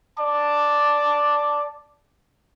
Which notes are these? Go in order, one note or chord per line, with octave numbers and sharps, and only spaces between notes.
D5 A5 D6